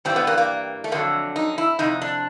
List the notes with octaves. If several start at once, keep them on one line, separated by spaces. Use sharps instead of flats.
G2 E3 G3 C4
B3
A#3
A#3
A3
F2 D3 F#3 A#3
D#4
E4
F2 C3 D#4
D4